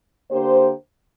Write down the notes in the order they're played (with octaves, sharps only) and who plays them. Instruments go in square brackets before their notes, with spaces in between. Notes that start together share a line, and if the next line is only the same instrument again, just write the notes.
[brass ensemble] D3 A#3 D4 G4 C5